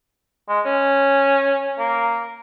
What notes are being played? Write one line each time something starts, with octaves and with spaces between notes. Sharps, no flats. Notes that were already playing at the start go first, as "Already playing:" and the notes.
G#3
C#4
A#3